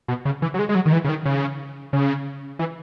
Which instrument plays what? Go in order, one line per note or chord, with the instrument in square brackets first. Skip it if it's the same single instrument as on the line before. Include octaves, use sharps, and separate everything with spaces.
[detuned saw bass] B2
C#3
E3
F#3
G#3
G#3
F#3
D#3
E3
C#3
D#3
C#3
C#3
E3